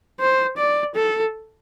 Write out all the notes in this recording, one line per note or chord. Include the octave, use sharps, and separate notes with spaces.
C5
D5
A4